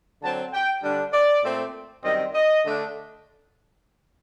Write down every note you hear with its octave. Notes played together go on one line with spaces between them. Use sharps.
D3 F#3 C4 A5
G5
D3 G3 D4
D5
A#2 A3 C4
F#2 D#3 G3 C4 D#5
D#5
D3 A3 D4